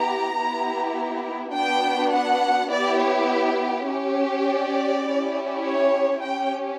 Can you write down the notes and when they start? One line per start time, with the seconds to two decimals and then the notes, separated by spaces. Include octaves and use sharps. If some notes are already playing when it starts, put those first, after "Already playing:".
Already playing: B3 E4 G4 A#5
0.37 B3 E4 G4
1.54 B3 D4 F#4 G5
2.13 F#5
2.71 B3 E4 G4 D5
3.01 C#5
3.88 C#4 G4
4.47 D5
5.05 C#4 E4 G4
5.64 C#5
6.22 C#4 G4 G5